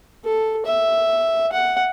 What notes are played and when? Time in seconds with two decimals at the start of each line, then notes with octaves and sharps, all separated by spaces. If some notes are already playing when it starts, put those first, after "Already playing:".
0.25 A4
0.66 E5
1.53 F#5